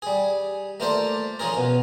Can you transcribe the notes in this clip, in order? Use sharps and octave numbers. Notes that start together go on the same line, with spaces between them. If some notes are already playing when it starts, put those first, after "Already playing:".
G3 G#4
A3 A#3 F4 C5 D5 A5
F3 C#4 F4 G#4 A#4
B2